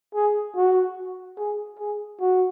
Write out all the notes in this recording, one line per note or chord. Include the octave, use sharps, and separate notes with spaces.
G#4
F#4
G#4
G#4
F#4